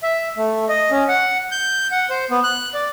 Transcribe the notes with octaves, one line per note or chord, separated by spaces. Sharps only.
E5
A3
D#5
C#4
F#5
G6
F#5
C5
B3
F#6
D5